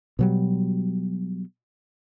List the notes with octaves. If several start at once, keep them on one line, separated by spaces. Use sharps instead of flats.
B2 F#3 G3